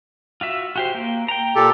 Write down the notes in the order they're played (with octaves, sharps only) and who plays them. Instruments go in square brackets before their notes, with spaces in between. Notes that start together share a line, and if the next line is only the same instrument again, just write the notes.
[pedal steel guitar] F4 F#4 E5
F#4 G4 C5
A#3
G5 A#5
[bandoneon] A#2 G4 A4